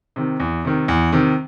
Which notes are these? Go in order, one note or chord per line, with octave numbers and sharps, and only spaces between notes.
C3 D#3
E2
C3 D#3
E2
C3 D#3